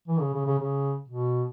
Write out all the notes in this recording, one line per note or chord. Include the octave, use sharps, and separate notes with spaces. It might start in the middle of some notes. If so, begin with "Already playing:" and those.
E3
C#3
C#3
C#3
C#3
B2